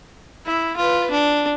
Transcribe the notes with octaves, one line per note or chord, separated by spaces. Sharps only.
E4
F4 B4
D4